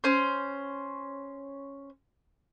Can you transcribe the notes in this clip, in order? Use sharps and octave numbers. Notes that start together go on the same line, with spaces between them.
C#4 C5